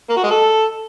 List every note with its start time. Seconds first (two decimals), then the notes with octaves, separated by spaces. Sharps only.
0.10 A#3
0.17 F#4
0.24 G#3
0.31 A4